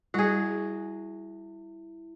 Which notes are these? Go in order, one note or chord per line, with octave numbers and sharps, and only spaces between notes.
G3 E4 F#4 G#4